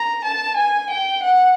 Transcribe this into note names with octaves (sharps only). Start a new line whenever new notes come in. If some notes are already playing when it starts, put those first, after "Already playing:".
Already playing: A#5
A5
G#5
G5
F#5